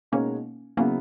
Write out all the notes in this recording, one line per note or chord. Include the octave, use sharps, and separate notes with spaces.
B2 G#3 A#3 C#4 D#4 A#4 C#5
C#3 F#3 A#3 B3 C#4 E4